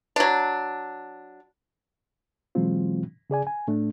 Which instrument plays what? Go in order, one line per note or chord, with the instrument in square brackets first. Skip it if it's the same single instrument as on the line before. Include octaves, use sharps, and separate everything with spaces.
[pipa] F#3 D4
[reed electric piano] B2 E3 F#3 G#3 C4 F4
C#3 G#4 D5 G#5
G#5
A2 A3 D4